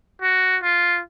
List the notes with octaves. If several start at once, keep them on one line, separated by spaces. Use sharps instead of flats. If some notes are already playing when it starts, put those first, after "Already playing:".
F#4
F4